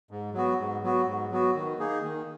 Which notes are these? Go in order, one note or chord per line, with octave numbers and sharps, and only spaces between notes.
G#2
F#3 B3 F#4
G#2
F#3 B3 F#4
G#2
F#3 B3 F#4
D#3
A#3 D#4 G#4
D#3